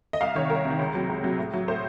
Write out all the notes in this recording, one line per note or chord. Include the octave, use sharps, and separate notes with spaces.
D#5
C2 F5
C3 D#3 C#5
C2 A#4
C3
D#3
C#2
C3 F#3
C#2
C3 F#3
A2
F#3
A2 C5